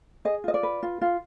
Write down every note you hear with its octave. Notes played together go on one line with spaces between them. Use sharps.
G#4 D#5
F4 D#5
D5
B4
F4
F4